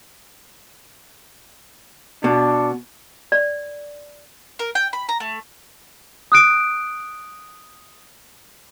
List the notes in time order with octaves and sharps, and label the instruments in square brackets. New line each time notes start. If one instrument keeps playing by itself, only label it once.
[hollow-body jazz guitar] B2 [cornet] D4
[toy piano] D5
[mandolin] A#4
G5
B5
A#5
A3
[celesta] D#6 F#6 D7